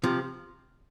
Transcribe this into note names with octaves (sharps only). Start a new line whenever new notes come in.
C3 F3